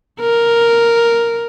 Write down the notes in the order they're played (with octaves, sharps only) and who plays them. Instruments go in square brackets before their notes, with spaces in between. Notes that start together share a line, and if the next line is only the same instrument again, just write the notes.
[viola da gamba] A#4